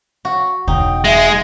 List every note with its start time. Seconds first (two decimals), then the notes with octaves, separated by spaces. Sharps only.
0.25 F#4
0.68 E1 C#3 D#4 G5
1.04 G#3 E5